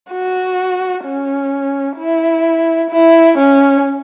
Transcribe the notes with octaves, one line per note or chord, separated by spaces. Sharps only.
F#4
C#4
E4
E4
C#4